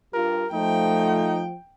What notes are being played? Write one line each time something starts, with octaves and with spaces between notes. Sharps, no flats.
G2 F4 G4 A#4
F3 A3 D#4 G5